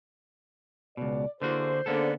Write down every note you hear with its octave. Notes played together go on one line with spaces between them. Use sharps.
C#2 B2 D5
D3 A#3 E4 F#4 G#4 C5
D3 A#3 B3 C#4 G#4 A4 C5